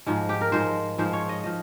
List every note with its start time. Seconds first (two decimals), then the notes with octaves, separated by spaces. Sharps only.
0.06 G#2 F3 G#3
0.29 G4
0.41 A#4
0.52 G#2 F3 G#3 C5
0.98 G#2 F3 G#3 C5
1.13 C#5
1.29 D#5
1.44 F3 D#5